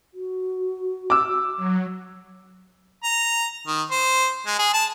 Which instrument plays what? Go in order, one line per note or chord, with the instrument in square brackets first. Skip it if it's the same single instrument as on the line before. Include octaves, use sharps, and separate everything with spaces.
[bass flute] F#4
[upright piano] D6 E6
[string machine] F#3
[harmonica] A#5
D#3
C5
G#3
G#4
A5